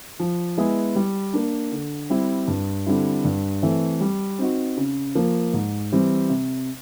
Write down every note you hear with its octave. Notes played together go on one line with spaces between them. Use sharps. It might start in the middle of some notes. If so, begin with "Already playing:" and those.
F3
G#3 B3 E4 G#4
G3
A#3 D4
D3
G3 C4 E4
G2
D3 G3 C4 E4
G2
E3 A3 C4
G3
C4 D#4 F#4
C#3
F3 A#3
G#2
E3 G3 C4
C3